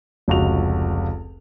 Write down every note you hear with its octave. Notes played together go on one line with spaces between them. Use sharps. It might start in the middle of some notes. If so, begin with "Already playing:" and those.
F1 C#2 F#4 F7